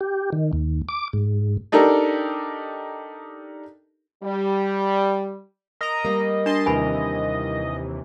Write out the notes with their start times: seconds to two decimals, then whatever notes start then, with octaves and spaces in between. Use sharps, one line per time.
0.01 G4
0.33 D#3
0.53 D#2
0.89 D6
1.13 G#2
1.72 D4 D#4 G4 A4 A#4
4.23 G3
5.81 A#4 D#5 A#5
6.05 G3 A#3
6.46 D4 A5 C6
6.66 D#2 C3 E3 G#5 B5